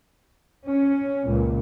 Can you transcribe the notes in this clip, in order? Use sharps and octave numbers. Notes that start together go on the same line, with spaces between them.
C#4
C#2 A#2